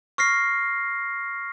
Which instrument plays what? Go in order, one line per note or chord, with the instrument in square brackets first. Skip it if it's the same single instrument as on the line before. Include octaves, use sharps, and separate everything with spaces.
[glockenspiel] C#6 F6 A#6 C7